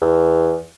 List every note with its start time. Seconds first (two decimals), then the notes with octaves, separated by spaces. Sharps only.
0.01 E2